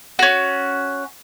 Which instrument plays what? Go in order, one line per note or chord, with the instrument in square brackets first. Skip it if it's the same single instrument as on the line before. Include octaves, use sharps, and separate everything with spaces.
[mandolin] C#4 F#4